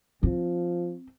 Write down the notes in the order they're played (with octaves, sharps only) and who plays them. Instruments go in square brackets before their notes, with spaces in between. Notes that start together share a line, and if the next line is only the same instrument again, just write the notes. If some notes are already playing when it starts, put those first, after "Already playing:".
[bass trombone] F3 [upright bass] C4